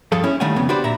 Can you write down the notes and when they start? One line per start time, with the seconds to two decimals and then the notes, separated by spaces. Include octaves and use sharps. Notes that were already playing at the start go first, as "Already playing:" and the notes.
0.12 G2 F3 G#4 A4 F5
0.24 C#4 E4
0.40 D#3 G3 A3 F5 F#5 G#5
0.56 F2 C#3 B3
0.69 D4 F#4 G4 B4 C5 D5
0.84 A#2 E5 A#5